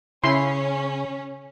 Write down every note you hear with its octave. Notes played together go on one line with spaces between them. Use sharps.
C#3 C#4 E4 C6